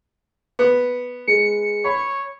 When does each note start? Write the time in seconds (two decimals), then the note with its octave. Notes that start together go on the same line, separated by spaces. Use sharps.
0.59 B3
1.27 G#3 C#7
1.85 C#5 B5